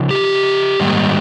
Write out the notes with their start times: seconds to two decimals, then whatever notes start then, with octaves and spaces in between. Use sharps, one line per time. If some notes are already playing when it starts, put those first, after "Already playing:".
Already playing: C#3 F3 D#4
0.11 G4
0.80 G#2 D#3 G3 A#3 D#4